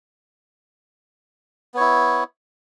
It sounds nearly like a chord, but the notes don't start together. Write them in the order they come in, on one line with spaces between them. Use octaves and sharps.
B3 C#5 E4